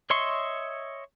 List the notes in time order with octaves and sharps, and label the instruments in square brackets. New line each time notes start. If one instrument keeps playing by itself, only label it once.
[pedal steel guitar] C#5 D#5 E5 C6 C#6